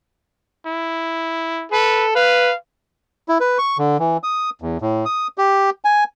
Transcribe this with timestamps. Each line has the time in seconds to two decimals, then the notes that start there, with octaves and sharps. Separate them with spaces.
0.66 E4
1.72 A4 B4
2.15 B4 F5
3.29 E4
3.40 B4
3.58 C#6
3.78 D3
3.99 E3
4.23 D#6
4.62 E2
4.81 A2
5.05 D#6
5.38 G4
5.85 G#5